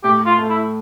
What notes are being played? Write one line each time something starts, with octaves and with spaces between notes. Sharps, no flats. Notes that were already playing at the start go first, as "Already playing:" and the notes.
A2 G4
F4
A3
E4